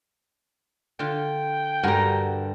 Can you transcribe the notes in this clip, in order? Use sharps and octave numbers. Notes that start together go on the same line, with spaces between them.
D3 F4 G5
G2 D3 G3 F#4 A#4 G#5 A#5